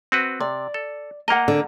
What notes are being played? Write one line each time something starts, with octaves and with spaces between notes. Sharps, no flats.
C4 F#4 B4
C3 D5
A4
A#3 A#4 D#5 F#5 A#5
D3